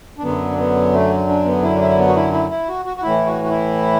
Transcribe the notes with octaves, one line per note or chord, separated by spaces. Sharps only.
D4
F#2 D3 F#3 B3
D4
B3
A3
D4
B3
E4
D4
E4
B3
F#4
E4
E4
E4
F#4
F#4
F#4
A2 E3 E4
F#4
F#4
E4